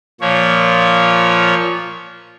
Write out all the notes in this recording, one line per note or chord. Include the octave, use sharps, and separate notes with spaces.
A#2 F3 C#5